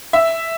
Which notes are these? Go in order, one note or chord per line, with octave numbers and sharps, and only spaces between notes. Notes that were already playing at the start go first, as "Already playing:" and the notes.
E5